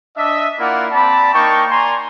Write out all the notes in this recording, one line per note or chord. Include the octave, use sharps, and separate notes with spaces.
D4 D#5 E5
A#3 E4 F4 D5 F5 F#5
C4 D5 A5 B5
A#3 D#4 G5 A5 C#6
D5 G#5 A#5 C6